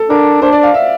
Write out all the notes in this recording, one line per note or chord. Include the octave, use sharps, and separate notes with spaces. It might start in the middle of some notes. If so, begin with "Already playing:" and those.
Already playing: A4
D4 A#4
D4 C5
D5
F5
E5